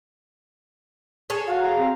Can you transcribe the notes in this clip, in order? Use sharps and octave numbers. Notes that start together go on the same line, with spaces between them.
G#4 A4 C#5
F#4 F5
A#5
C4